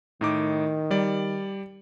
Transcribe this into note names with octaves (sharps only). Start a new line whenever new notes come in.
A2 D#3 D#4 D6
G3 D5